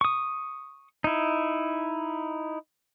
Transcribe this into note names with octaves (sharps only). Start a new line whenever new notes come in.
C#6 D#6
D#4 E4